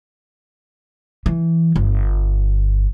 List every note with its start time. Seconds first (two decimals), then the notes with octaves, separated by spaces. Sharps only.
1.26 E3
1.76 G1